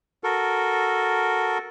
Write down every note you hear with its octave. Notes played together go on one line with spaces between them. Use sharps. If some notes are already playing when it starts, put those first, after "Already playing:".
F#4 A4 A#4